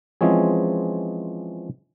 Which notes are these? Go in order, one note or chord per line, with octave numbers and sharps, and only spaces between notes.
E3 F3 G#3 C4 C#4 G#4